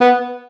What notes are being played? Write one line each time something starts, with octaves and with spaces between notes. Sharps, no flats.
B3